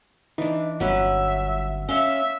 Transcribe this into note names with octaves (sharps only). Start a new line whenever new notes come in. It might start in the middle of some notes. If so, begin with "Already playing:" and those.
E3 D4 D#4
G1 F#3 C#4 B4 E5
C#4 C#5 E5 F5 C6